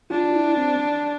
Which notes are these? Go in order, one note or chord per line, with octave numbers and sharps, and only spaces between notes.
D4 F4
E4
C4